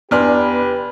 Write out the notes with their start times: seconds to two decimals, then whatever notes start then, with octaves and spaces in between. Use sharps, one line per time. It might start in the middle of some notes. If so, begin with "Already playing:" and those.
0.11 E2 B3 D4 G4 B4 D5 C6 F6